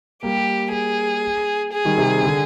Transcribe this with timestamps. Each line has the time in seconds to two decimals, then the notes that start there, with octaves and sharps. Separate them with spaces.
0.23 G3 A#3 G4
0.73 G#4
1.73 G#4
1.85 D#3 G3
1.98 C3
2.23 D3